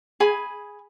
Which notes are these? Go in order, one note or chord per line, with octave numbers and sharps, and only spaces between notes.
G#4 G#5 B5